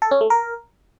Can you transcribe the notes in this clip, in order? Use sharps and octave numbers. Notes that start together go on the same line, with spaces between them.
A4
C#4
A3
A#4